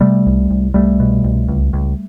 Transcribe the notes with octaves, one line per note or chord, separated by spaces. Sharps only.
C3 G3 A3
C2
C2
C2 G3 A3
B2
C2
C#2
C#2